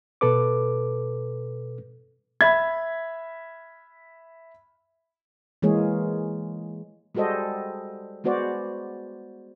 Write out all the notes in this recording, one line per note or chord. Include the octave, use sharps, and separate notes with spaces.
B2 A4 B4 D6
E5 B5 G#6
E3 G#3 A#3 G#4 C#5
G3 G#3 F#4 A4 C5 D#5
G#3 B3 F#4 C5 D5